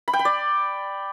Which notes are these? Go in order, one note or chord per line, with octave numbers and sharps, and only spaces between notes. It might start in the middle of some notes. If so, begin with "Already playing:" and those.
B5
G5
B5
D5